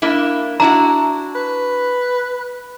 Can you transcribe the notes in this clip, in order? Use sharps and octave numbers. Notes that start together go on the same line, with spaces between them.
A#3 D4 E4
D4 E4 F#4 A#5
B4